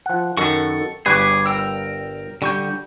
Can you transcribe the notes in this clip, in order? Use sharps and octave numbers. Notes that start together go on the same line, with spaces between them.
F3 F#5
F#2 D#3 A4 F#5 C#6
G1 G3 G#4 B4 C#6 D6
A#4 G5 E6
D3 G3 C#6 G6